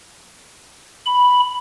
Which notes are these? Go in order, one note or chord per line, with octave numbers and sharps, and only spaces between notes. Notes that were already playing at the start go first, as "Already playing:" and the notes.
B5